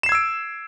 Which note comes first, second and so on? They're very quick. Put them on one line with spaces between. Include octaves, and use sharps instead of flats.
E7 C7 G#6 E6 D7